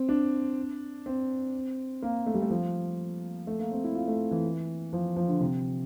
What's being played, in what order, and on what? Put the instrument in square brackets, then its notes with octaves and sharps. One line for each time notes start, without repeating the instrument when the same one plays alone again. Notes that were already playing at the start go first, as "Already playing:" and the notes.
Already playing: [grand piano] C4
D4
C4
A#3
A3
G3
A3
F3
A3
A#3
C4
E4
F4
A3
E3
F3
F3
D3
C3